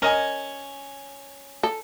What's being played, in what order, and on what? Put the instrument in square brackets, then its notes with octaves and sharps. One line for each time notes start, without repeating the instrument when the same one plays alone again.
[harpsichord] C#4 [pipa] A#4 D#5 G#5
[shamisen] A4